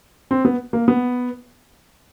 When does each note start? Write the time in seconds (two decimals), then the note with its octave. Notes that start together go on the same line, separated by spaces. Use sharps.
0.31 C4
0.45 B3
0.73 A#3
0.88 B3